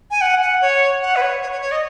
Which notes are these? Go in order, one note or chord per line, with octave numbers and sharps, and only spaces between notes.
G#5
F#5
F#5
C#5
F#5
B4
C#5
C#5
C#5
C#5
D#5